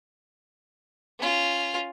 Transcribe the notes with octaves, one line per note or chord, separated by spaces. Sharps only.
C#4 F4